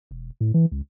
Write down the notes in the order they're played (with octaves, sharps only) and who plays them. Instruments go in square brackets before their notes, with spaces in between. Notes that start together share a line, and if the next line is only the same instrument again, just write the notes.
[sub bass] E1
A2
E3
C#2